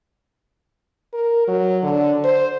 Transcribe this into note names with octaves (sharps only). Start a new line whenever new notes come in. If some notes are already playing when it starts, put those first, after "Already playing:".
A#4
F#3
D3
C5